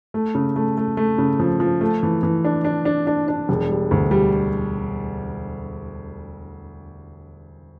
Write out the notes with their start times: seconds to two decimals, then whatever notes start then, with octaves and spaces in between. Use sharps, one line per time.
0.14 A3
0.35 C#3
0.56 A3
0.77 A3
0.97 A3
1.18 C#3
1.40 F3
1.60 F3
1.81 A3
2.03 E3
2.23 E3
2.44 D4
2.64 D4
2.85 D4
3.07 D4
3.28 D4
3.49 E1
3.69 G3
3.91 D2
4.11 G3